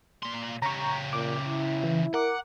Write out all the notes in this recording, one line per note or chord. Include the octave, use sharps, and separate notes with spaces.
A#2 C6
C#3 G4 A#5 C#6
A#2 D6
E4
E3
A#4 F#5 D6